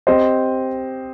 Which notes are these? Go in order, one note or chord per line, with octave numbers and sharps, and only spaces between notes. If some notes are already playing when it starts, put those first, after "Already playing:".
C4 G4 C5 D#5